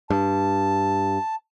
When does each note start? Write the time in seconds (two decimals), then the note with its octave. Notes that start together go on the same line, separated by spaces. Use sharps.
0.10 G2 A5